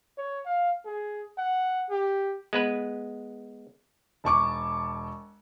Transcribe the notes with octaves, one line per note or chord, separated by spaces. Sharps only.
C#5
F5
G#4
F#5
G4
G#3 B3 B4
E1 A5 C#6 D6